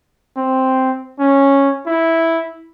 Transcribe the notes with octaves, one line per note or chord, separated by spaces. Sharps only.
C4
C#4
E4